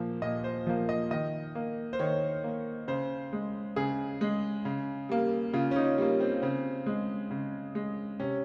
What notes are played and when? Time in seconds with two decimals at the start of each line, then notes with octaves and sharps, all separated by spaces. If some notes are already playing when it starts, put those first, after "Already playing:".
Already playing: A#2 F3 A#3
0.22 A#2 D#5
0.44 C5
0.67 F3 A#3
0.89 D#5
1.11 D#3 D#5
1.55 A#3
1.93 C5
1.99 D#3 C#5
2.44 A#3
2.88 C#3 C5
3.33 G#3
3.76 C#3 G#4
4.21 G#3
4.65 C#3
5.09 G3 A#3
5.53 C#3 F4
5.71 C#4
5.76 D#4
5.98 G3 A#3
6.20 C4
6.42 C#3 C4
6.86 G#3
7.31 C#3
7.75 G#3
8.20 C3 C#4